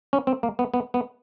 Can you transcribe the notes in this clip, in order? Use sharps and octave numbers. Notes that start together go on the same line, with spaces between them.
C#4
C4
A#3
B3
B3
B3